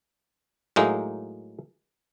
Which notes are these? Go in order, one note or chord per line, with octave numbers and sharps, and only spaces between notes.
A2 F#3 G#3 A#3 D#4